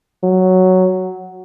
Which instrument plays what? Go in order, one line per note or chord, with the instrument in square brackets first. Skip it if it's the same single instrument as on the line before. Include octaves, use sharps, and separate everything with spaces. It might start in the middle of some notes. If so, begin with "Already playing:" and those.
[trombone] F#3